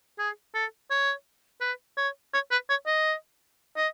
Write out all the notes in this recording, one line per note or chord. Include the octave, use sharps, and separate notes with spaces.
G#4
A4
C#5
B4
C#5
C#5
B4
C#5
D#5
D#5